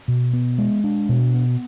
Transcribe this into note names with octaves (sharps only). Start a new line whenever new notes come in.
B2
B3
G#3
D4
B2
B3